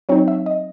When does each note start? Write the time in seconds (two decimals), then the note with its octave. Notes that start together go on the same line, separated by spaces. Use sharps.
0.09 F#3 C4 D#4 C#5
0.28 E5
0.46 D#5